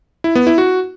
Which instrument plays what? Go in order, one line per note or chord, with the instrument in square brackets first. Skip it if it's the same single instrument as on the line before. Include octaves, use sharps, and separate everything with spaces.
[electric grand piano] E4
B3
E4
F#4